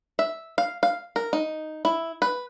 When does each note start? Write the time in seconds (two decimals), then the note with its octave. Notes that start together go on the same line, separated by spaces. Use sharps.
0.19 E5
0.58 F5
0.83 F5
1.16 A#4
1.33 D#4
1.85 E4
2.22 B4